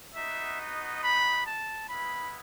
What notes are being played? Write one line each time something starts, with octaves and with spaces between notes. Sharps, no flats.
B3 D#4 F#4 E5
D#5
B5
A5
G#3 B3 E4 B5